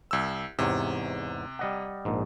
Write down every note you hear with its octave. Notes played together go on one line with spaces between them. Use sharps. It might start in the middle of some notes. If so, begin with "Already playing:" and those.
C2 E6
E2 G#2 C3 C#5
G3 D#5 F#5
A#1 G#2